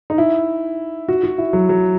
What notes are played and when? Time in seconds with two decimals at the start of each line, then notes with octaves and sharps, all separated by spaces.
0.10 D#4
0.18 E4
1.08 F#4
1.23 F#4
1.38 E4
1.53 F#3
1.69 F#3